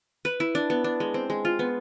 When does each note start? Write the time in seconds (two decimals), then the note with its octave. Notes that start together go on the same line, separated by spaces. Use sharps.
0.25 B4
0.40 E4
0.55 D4
0.70 B3
0.84 D4
1.00 G#3
1.14 C4
1.30 G#3
1.45 F4
1.59 B3